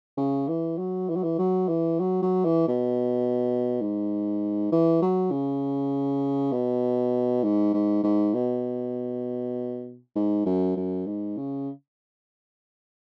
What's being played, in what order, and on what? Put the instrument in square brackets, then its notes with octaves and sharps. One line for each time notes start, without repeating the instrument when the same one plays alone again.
[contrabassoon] C#3
E3
F#3
E3
F#3
E3
F#3
E3
F#3
F#3
E3
B2
G#2
E3
F#3
C#3
B2
G#2
G#2
G#2
B2
G#2
F#2
F#2
G#2
C#3